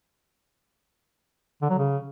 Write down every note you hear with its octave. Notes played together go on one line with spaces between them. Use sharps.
D3
F#3
C#3